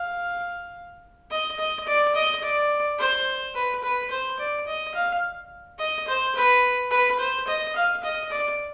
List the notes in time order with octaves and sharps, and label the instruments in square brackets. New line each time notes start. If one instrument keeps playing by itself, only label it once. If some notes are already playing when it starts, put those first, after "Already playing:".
Already playing: [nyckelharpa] F5
D#5
D#5
D5
D#5
D5
C5
B4
B4
C5
D5
D#5
F5
D#5
C5
B4
B4
C5
D#5
F5
D#5
D5